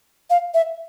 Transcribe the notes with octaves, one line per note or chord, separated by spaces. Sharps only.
F5
E5